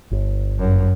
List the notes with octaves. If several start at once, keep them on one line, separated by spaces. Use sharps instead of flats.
G1
F#2